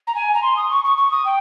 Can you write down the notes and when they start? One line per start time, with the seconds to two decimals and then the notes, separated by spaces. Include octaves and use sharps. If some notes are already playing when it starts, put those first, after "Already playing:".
0.07 A#5
0.15 G#5
0.34 A#5
0.42 C6
0.56 D#6
0.70 C#6
0.84 C#6
0.98 C#6
1.11 D#6
1.25 G5